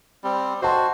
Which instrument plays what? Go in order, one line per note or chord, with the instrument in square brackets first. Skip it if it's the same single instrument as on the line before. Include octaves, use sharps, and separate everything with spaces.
[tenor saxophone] G3 [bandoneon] C4
[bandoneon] F#4 [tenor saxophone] C5 [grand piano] D#5 A5 C6